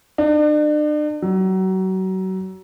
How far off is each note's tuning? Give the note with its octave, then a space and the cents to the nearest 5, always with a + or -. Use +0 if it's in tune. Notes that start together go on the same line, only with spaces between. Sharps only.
D4 +40
F#3 +30